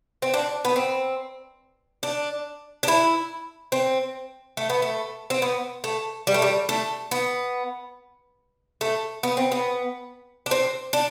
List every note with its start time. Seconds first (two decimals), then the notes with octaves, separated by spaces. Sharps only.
0.22 C4
0.34 D4
0.65 B3
0.76 C4
2.03 D4
2.83 D4
2.88 E4
3.72 C4
4.57 A3
4.70 B3
4.82 A3
5.30 C4
5.42 B3
5.84 A3
6.27 G3
6.34 A3
6.42 G3
6.69 A3
7.11 B3
8.81 A3
9.23 B3
9.37 C4
9.52 B3
10.46 D4
10.51 C4
10.93 D4